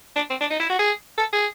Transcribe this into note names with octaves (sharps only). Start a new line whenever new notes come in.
D4
C4
D4
D#4
E4
F#4
G#4
A4
G#4